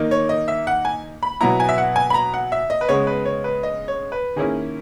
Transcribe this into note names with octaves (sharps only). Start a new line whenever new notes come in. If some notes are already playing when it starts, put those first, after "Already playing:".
Already playing: D#3 A#3 D#4
C#5
D#5
E5
F#5
G#5
B5
B2 F#3 B3 E4 A#5
G#5
E5
F#5
G#5
B5
A#5
F#5
E5
D#5
B4
C#3 G#3 B3 C#5
B4
C#5
B4
D#5
C#5
B4
D#3 A#3 C#4 E4 G#4